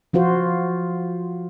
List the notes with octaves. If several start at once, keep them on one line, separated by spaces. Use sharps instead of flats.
F3 F4 F#4 C5